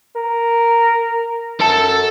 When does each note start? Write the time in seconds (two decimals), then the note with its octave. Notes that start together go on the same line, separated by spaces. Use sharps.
0.16 A#4
1.61 F#2 A4 A5